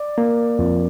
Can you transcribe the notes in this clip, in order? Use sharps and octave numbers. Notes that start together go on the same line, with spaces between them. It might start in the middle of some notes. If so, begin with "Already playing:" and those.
Already playing: D5
A#3
F2